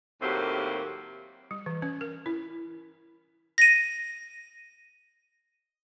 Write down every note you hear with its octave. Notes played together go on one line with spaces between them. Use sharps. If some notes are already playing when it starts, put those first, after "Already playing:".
D#2 A2 F#3 A#3 C4 G4
G3
E3
C#4
A#4
E4
A#6 D#7